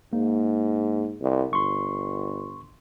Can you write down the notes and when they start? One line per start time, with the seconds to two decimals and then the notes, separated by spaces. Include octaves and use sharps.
0.13 G#2 A#3
1.21 C2
1.53 G1 C6 C#6